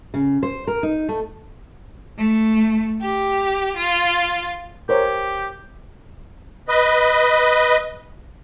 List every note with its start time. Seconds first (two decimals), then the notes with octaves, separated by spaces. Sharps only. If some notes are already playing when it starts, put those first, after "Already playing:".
0.14 C#3
0.43 C5
0.67 A#4
0.83 D#4
1.09 A3
2.17 A3
3.03 G4
3.76 F4
4.89 G4 A#4 C5 C#5
6.68 B4 D#5